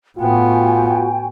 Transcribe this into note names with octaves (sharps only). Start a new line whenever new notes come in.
A2 B3 F4 F#4 G5 G#5